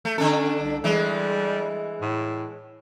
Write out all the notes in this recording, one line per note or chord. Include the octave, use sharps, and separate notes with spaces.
A3
D3 C#4 D4 A4
C2
E3 G3 G#3
A2